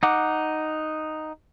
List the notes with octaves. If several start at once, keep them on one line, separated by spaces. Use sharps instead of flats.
D#4 F#5 D6